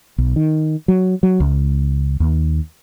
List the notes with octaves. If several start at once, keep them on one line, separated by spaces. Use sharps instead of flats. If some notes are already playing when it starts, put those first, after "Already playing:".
B1
D#3
F#3
F#3
C#2
D#2